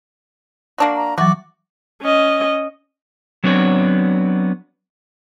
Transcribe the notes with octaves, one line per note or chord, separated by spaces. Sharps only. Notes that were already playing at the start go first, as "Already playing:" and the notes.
A#3 D4 F#4
A#5
E3 F#3 F#4 D6
C#4 D#5
F#3 B3 C4 D4 C#5